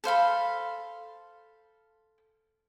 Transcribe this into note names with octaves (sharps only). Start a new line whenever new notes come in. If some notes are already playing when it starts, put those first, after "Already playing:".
A4 C5 F5 B5